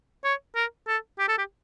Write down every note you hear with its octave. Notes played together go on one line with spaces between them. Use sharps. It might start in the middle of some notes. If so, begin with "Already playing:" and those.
C#5
A#4
A4
G4
A4
G4